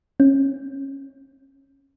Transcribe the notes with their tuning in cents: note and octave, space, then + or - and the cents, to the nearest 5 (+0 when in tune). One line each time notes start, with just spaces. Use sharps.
C#4 -20